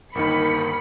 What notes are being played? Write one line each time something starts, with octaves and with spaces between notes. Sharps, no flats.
G1 D#2 D#3 A#4 B5 C#7